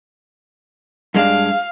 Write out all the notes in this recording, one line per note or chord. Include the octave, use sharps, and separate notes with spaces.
G2 G#3 D4 F5